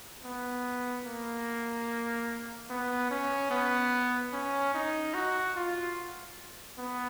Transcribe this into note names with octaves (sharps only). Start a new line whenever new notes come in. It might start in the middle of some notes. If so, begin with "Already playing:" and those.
B3
A#3
B3
C#4
B3
C#4
D#4
F#4
F4
B3